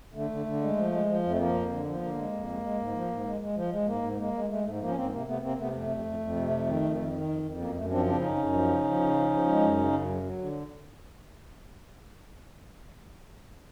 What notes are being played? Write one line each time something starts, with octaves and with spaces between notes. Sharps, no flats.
D3 A3
D3
D3
G#3
F3
G#3
F3
F2
A3
F3 A#3
F2
D3
F3
B3
D3 A#3
G#3
F2
G#3
G#3
G#2
F3
G#2
G#3
G#3
F3
G#3
G#2 A#3
G#2
G#3 A#3
G#3
G#3 A3
G#2 A3
A3
F3 A#3
C#4
G#2 A#3 C4
C3 A#3
C3 A3 B3
C3 A#3 C4
C3 A3 B3
F2 A3
F2
F2
F2
C3
F2
D#3
F2
D#3
D#3
F2
F2
F#2 A#3
F#2 A3
F3 C4 D4
C#3 C4 D4
F#2 C#4 D#4
F#2
F3
C#3
F3
C#3
F3
F3
G#3
F#2
C#3
F#2
F#3
F#3
D3